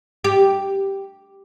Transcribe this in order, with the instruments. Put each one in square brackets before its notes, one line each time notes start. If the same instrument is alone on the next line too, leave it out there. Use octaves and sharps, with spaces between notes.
[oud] G4